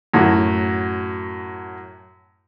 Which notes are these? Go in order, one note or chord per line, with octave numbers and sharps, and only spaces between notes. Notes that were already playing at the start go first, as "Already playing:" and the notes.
F#2 A2 F#4